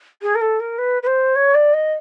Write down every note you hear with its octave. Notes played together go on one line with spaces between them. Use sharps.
G#4
A#4
A4
A#4
B4
B4
C5
C#5
D5
D#5